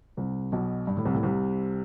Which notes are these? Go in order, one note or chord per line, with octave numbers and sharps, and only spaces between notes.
C2 C3
B1 B2
G2
A2
C2 C3
A2
C2 C3